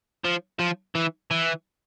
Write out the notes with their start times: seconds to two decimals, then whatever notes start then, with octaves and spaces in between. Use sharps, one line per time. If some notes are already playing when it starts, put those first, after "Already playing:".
0.25 F3
0.59 F3
0.95 E3
1.31 E3